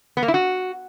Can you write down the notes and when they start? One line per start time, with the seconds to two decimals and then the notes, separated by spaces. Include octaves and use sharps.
0.17 B3
0.23 A#3
0.28 E4
0.34 F#4